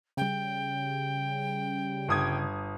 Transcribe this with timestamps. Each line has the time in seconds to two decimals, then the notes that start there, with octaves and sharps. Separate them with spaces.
0.17 C#3 G3 G5
2.09 G1 D#6 G#6